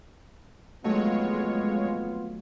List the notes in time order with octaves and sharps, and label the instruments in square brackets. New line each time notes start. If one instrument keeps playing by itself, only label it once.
[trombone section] F2 B3 F4 [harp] D#3 F#3 A3 [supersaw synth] G#3 C#5